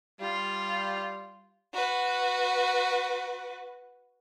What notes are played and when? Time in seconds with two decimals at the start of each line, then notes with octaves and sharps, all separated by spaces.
0.21 G3 F4
1.73 F#4 B4